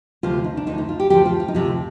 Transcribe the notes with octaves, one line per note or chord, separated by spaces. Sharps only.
D2 C3 F3 F4
D#4
D4
D2 C3 F3 D#4
D#4
F4
G4
D2 C3 F3 G4
F4
F4
D#4
D2 C3 F3 F4